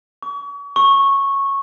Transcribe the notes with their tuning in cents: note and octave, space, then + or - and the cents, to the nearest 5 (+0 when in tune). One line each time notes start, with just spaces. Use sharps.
C#6 +40
C#6 -10